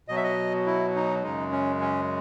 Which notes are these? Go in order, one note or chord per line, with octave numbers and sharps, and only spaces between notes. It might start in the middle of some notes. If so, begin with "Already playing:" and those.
B2 F#3 D#5
E5
D#5
E4
D#4
F#2 C#3 G#3 D#4
C#4
C#4